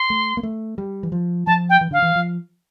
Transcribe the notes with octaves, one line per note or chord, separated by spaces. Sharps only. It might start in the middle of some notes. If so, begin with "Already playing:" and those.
Already playing: C6
A3
A#3
A3
G3
E3
F3
F3 A5
G5
E3
D3 F5
E3
F3